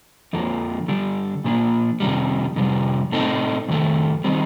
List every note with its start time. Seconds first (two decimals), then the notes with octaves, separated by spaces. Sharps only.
0.33 F2 D3 F3 A#3
0.88 D3 G3 D4
1.44 A#2 F3 A#3 D4
2.00 F2 C3 D#3 G3
2.56 F2 C3 G3
3.12 A2 A3 C4 D#4
3.68 F2 D#3 A3
4.24 D#3 G3 C4 D#4